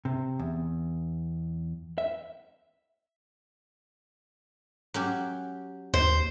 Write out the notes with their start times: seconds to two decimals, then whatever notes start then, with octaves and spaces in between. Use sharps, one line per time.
0.05 C3
0.39 E2
1.98 E5
4.94 F#3 C#4 G4
5.94 D#2 C5